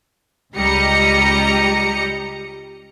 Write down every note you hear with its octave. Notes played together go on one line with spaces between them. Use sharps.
C#2 G3 G4 D#5 A#5 C#7